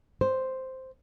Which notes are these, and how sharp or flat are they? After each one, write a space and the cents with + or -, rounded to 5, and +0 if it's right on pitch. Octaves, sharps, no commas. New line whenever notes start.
C5 +0